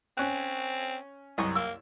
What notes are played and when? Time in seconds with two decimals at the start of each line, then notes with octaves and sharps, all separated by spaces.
0.17 C4 C#4 F#6
1.38 C2 F#2 D#5 C#6
1.55 A#3 E6